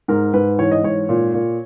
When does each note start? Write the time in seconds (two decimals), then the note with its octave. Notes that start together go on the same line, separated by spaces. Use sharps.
0.08 G#2 A#4
0.34 G#2 B4
0.59 E3 C#5
0.71 D#5
0.83 G#2 C#5
1.09 A#2
1.34 A#2